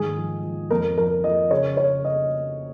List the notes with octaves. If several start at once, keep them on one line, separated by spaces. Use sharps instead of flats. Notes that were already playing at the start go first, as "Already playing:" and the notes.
Already playing: G#2 D#3 G#4
F3
F3
F2 A#4
F3 A#4
F3 D#5
C#3 C#5
C#3 C#5
D#5